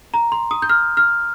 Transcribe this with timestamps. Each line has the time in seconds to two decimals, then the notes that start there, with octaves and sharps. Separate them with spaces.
0.14 A#5
0.32 C6
0.51 D#6
0.62 G6
0.69 F6
0.97 F6